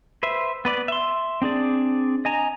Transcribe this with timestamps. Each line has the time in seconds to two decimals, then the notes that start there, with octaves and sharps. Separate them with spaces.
0.23 B4 C5 E5
0.65 B3 B4 D5
0.88 E5 C6
1.42 C4 D4 G#4 D5
2.25 D#5 G#5 A#5